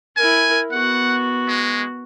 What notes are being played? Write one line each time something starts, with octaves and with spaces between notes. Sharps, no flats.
E4 A#4 G#5
B3 F#4 F#5
G#3